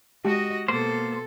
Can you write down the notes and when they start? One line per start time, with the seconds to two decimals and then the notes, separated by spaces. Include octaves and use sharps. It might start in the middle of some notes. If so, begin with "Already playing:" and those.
0.25 G#3 F#4 G4 D#5
0.68 B2 A#3 A4 C5